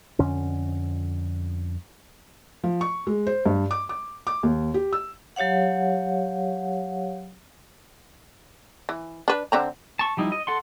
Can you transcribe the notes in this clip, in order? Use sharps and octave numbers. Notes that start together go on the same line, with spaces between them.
F2 D3 C#4
F3
C#6
G#3
C5
G2
D6
D6
D6
D#2
G4
E6
F#3 G4 C#5 F5 F#5
E3
D4 B4
D3 C4 A#5
A5 C#6
F3 G3 D#4 E4
D#5
A4 F#5 C6